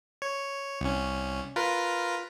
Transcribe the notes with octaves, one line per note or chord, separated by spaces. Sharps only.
C#5
C2 C#4
F4 A#4 B4